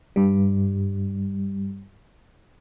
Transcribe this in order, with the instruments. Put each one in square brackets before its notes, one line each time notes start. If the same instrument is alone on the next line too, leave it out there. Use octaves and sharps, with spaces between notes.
[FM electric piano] G2 G3